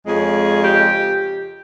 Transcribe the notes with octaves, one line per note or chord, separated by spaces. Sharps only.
F2 C#3 G#3 G#4
G4